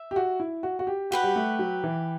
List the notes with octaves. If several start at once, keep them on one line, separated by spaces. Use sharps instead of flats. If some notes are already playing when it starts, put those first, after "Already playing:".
Already playing: E5
G4
F#4
E4
F#4
F#4
G4
F#4 G4 B4 F#5
G3
A3
F#3
E3